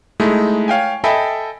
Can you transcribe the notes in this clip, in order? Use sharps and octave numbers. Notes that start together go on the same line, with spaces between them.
G#3 A3 D#4 E4
C#5 F5 G5 G#5
A4 D#5 E5 G5 G#5 B5